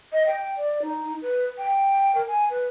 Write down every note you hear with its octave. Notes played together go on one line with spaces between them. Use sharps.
D#5
G5
D5
D#4
B4
G5
A#4
G#5
B4